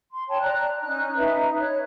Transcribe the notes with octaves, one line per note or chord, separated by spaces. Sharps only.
C6
C#5 G5 A5 C6
D5 A#5 F#6
C#4 D#4 F#6
D#4 B4 E5
C#5 F#6